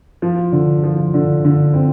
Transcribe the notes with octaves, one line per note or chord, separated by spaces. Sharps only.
F3
D3
F3
D3
D3
C4